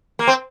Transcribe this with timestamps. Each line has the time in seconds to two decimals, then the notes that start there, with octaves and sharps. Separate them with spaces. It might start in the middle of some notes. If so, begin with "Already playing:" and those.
0.19 A#3
0.27 C4